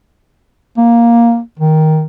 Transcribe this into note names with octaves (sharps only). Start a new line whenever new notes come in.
A#3
D#3